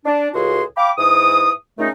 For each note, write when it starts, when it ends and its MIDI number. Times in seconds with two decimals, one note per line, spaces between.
0.05 0.28 62
0.34 0.62 37
0.34 0.62 45
0.34 0.62 66
0.34 0.62 68
0.34 0.62 84
0.76 0.90 77
0.76 0.90 79
0.76 0.90 83
0.76 0.90 86
0.98 1.50 44
0.98 1.50 52
0.98 1.50 87
1.78 1.88 46
1.78 1.88 49
1.78 1.88 57
1.78 1.88 61
1.78 1.88 63